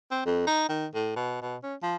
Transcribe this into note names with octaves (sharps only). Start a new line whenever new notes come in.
C4
F2
D#4
D#3
A2
B2
B2
C#4
F3